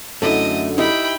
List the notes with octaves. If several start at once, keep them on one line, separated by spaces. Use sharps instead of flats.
F#2 D3 A3 E4 D#5
D#4 E4 G4 G5 B5